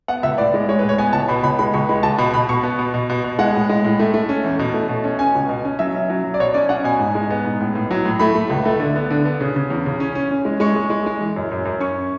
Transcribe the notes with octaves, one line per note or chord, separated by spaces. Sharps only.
B3 F#5
C#2 E5
A2 D5
G#3
G#3 C#5
A2 B4
C#5
B3 G#5
C#2 A5
B2 B5
C#2 B5
G#3 B5
C#2 C#6
G#3 B5
C#2 A5
B2 B5
B2 B5
B2 C#6
B3
B2
B2
B2
B2
G#3 F#5
A2
G#3
A2
A3
A3
C#4
E2
B2
A3
B2
C#4
C#4 G#5
C#2
B2
C#4
F#3 E5
C#4
F#3
F#3
D5
B2 C#5
C#4 D5
C#4 F#5
B2 G#5
G#2
G#3
B3
G#2
A2
A2
F#3
A2
A3 B5
A3
C#2
A3
D3
B3
D3
B3
C#3
C#3
E2
C#3
C#4
C#4
C#4
G#3
G#3 C#6
G#3
G#3
G#3
E3
F#2
F#2
F#2
C#4 C#6